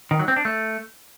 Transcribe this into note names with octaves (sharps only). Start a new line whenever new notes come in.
D#3
F#3
C4
D4
A3